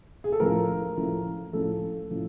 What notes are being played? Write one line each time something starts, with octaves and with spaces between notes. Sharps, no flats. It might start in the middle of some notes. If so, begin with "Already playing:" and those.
G#4
A4
A2 F3 A3 C#4 E4 A#4
A2 F3 A3 C#4 E4
A2 F3 A3 C#4 E4 A4
A2 F3 A3 C#4 E4